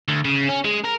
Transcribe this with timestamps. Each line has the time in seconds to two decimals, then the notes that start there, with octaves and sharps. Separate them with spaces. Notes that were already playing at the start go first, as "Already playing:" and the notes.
0.09 D2
0.25 C#3
0.48 C#4
0.65 G#3
0.84 A#4